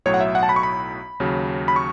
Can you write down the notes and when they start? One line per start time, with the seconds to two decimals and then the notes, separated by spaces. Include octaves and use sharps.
0.06 B1 A2 F#3 C#5
0.14 F#5
0.21 E5
0.35 F#5
0.43 A5
0.49 B5
0.56 C#6
0.63 B5
1.20 D#2 C#3 F#3
1.68 B5
1.76 C#6